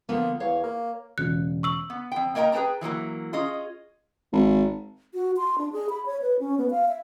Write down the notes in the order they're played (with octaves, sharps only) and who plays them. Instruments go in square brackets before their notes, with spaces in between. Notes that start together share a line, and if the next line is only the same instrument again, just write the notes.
[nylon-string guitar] D3 F3 B3 [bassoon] A#3
[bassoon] E2 [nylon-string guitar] C#5 F5
[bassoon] A#3
[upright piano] E1 C#3 [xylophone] F#6
[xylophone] C#6 E6 F#7
[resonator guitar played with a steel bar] B3
F2 G5
A#3 A#4 D#5 G5 A#5
G#4 B4 G5 A5 A#5
E3 F#3 G#3 A#3
C#4 F4 G#4 D#5
[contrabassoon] G#1
[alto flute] F#4
C6
D4
G#4
B5
C#5
B4
C#4
B3
F5
E5